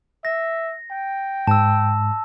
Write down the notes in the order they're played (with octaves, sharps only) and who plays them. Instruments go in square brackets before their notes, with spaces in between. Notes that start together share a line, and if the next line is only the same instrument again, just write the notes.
[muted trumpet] E5 [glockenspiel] A#6
[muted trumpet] G5
[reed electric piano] G#2 [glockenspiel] A5 E6